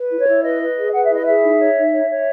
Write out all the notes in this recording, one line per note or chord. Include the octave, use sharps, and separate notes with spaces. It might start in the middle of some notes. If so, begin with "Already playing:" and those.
Already playing: B4
E4
C#5
E4
B4 D#5
B4
G#4
B4 F#5
E5
E4 D#5
G#4 E5
D#4
C#5
D#4
C#5
C#5